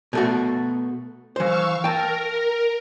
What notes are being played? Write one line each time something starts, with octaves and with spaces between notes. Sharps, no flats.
B2 A3 F#4
E3 C5 F5 C#6 E6
A#4 G5 A5